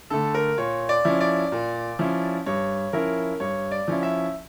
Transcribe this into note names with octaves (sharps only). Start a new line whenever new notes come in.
D3 A3 A4
A#4
A#2 C#5
D5
F3 C#4 E4
D5
A#2
F3 C#4 E4
G2 C#5
F3 C#4 E4 A#4
G2 C#5
D5
F3 C#4 E4
E5